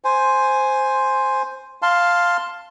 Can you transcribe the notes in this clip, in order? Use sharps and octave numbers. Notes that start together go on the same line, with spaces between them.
C5 G#5
F5 A5 C6